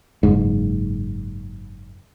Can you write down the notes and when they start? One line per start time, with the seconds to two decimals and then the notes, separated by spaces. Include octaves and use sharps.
0.23 F#1 G#2